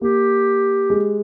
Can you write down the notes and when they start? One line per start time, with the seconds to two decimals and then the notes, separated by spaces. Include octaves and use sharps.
0.01 A#3 G4
0.90 G#3